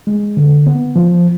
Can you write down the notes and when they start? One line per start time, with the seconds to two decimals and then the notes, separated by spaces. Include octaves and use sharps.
0.07 G#3
0.37 D3
0.66 B3
0.96 F3